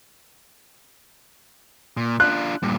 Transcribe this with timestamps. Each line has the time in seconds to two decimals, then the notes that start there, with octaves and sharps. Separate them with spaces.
1.97 A#2
2.20 D4 F4 F#6
2.62 G2 A#2